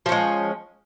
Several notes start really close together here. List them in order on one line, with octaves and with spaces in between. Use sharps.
F3 C#4 G#3